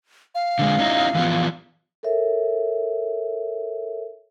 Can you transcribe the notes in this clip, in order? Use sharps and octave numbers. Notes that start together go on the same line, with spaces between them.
F5
D3 G#3
C#4 D#4 E4
E3 F3 B3
A4 A#4 C#5 E5